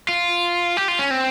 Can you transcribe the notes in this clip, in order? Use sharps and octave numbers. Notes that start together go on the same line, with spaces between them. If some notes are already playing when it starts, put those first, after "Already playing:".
F4
G4
F4
C#4
C4